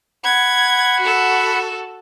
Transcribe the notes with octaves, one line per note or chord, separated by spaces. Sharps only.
F#5 B5 G#6
F#4 A4